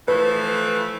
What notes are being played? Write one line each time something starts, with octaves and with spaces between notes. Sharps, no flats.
E3 F3 A3 B4